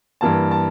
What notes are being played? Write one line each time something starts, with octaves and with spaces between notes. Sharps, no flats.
G2 E3 A#3 A5
A5